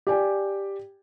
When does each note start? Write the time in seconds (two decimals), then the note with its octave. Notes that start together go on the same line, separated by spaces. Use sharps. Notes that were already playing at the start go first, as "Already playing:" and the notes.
0.07 G4 D5 G5 G#5